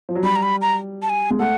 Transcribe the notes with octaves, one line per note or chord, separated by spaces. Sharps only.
F3
F#3
G3 B5
A#5
B5
A#5
A5
G#5
G#3
A3 F#5